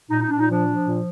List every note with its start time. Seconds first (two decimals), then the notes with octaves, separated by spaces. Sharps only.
0.10 A#2 D#4
0.20 D#4
0.29 A#2 D4
0.39 D#4
0.48 F3 D4
0.67 F3
0.86 A#2